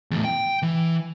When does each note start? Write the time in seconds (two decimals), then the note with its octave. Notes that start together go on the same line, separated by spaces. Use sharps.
0.11 E2 A2
0.24 G5
0.62 E3